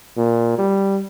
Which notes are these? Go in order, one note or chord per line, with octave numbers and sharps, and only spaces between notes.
A#2
G3